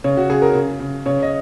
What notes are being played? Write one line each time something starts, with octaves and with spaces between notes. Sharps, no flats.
C#3 C#5
F#4
C#3 G#4
A#4
C#3
C#3
C#3 C#5
D#5